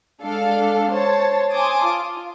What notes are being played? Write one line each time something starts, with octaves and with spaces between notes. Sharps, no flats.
G#3 D4 A4 F5
C5 C#5 A5
G#5 A5 C6 D6 D#6
F4